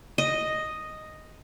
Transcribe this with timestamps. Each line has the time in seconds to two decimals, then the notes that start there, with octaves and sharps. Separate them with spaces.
0.18 D#5